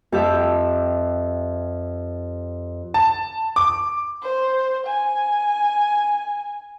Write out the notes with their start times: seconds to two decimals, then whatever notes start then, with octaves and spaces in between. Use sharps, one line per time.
0.12 F2 G4 E5
2.94 A5
3.56 D6
4.22 C5
4.87 G#5